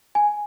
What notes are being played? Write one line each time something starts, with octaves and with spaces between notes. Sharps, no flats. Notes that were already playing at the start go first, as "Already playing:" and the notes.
G#5